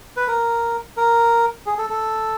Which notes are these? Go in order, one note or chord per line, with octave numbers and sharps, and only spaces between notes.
B4
A#4
A#4
G#4
A4
A4